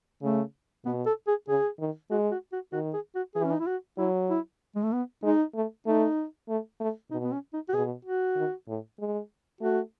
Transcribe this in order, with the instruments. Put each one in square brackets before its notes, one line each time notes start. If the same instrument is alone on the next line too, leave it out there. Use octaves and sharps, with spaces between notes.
[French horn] C#3 [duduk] A3
[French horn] B2 [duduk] B3
[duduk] A4
G#4
[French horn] C#3 [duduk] G#4
[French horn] D#3
[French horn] G#3 [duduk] F#4
[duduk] F#4
F#4
[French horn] D#3 [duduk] F#4
[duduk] G#4
F#4
[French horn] E3 [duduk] G#4
[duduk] C#4
D#4
E4
F#4
[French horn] F#3 [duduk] E4
[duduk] E4
G#3
A3
B3
[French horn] G#3 [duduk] D#4
[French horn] A3
[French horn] A3 [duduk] D#4
[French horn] A3
A3
[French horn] B2 [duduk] D#4
[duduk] B3
C#4
D#4
F#4
[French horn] B2 [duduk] G#4
[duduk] F#4
[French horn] D#3
A2
G#3
[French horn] A3 [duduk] F#4